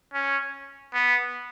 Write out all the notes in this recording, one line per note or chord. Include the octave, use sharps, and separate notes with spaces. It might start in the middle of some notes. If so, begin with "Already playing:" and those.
C#4
B3